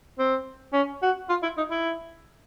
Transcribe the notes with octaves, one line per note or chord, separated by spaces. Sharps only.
C4
C#4
F#4
F4
E4
D#4
E4